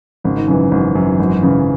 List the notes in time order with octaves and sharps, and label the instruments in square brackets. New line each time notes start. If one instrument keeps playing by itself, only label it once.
[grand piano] G#1 [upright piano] C#3
[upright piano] D#3
[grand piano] F#2 E3 [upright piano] C#3
[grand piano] G#1
F#2 E3
G#1
[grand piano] F#2 E3 [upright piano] C#3